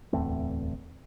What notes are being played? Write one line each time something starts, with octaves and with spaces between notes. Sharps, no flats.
D1 E2 A3 C4